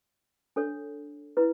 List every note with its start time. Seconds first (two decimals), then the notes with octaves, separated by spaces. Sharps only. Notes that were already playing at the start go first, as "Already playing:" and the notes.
0.56 D4 A4 C#5
1.37 E4 B4